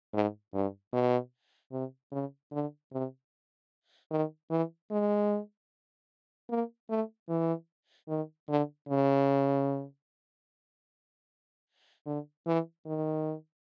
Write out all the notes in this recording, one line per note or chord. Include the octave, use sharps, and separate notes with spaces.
G#2
G2
B2
C3
C#3
D3
C3
D#3
E3
G#3
A#3
A3
E3
D#3
D3
C#3
D3
E3
D#3